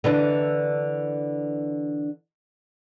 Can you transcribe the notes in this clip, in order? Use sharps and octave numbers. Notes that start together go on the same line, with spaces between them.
D3 E3 D4